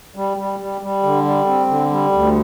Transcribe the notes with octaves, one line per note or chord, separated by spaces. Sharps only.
G3
G3
G3
G3
D3
G3
C4
D3
G3
D2